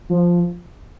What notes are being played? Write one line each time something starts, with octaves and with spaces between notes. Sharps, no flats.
F3